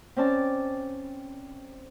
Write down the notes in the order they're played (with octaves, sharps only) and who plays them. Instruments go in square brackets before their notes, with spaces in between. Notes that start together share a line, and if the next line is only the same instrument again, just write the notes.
[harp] C4 C#4 D5 A5